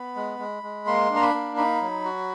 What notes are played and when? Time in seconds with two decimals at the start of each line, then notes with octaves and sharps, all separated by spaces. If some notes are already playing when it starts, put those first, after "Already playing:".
Already playing: B3 B5
0.16 G#3
0.39 G#3
0.63 G#3
0.86 A#3 C6
1.10 D4
1.16 A#5
1.22 B5
1.34 A#3
1.57 D#4 B5
1.81 F#3
2.05 F#4